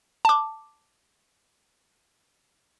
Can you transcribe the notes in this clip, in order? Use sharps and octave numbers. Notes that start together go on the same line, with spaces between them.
A5 D6